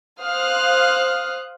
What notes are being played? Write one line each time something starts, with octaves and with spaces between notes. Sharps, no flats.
C5 F5 D#6 F6 F#6